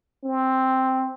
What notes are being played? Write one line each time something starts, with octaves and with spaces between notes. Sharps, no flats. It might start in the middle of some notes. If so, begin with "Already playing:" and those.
C4